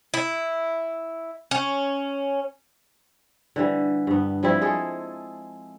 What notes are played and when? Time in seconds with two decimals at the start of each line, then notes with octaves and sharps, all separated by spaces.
0.14 E4
1.51 C#4
3.56 D3 E3 G3
4.07 G2 B3
4.43 F3 G3 C4 E4
4.62 G#3 G#4 A4